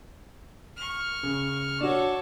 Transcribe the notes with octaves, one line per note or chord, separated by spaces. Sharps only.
C#6 F6
C#3
D4 F#4 A4 C#5